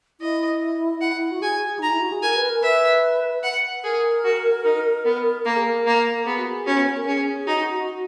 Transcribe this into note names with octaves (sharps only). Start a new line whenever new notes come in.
E4 D#5
F#5
F#4
G#4 G#5
D#4 A#5
E4
F#4
G#4
A#4 G#5
B4
A#4
B4 E5
F#5
G#4 A#4
F#4
D#4
B3
A#3 A#4
G#4
A#4
A#3
B3 G#4
F#4
G#4
C#4 F#4
B3
A#4
C#4 G#4
D#4 F#4